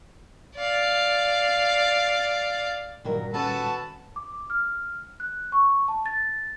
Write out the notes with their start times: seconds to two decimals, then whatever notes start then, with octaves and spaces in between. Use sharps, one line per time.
0.57 D5 F5
3.05 G2 A#2 D#3 F#3 G3 A#4
3.34 C#4 F#4 A4 B4 A5
4.16 D6
4.50 F6
5.20 F#6
5.52 C#6
5.88 A5
6.06 A6